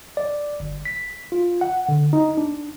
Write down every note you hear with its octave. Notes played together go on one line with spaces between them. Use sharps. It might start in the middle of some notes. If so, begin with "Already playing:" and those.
D5
G1
B6
F4
F#5
D3
D#4
D4